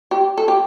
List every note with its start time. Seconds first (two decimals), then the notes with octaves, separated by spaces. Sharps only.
0.11 G4
0.38 A4
0.48 G4